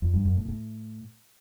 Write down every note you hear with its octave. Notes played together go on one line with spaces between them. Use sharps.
F2
G2
F#2
A2
A2